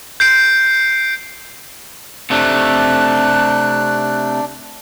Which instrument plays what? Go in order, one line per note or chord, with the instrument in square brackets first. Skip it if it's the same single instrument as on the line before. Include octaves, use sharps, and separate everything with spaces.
[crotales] G6 C7 D7
[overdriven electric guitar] C3 A3 [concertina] D4 [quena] F#6